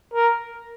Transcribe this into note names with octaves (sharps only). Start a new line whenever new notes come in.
A#4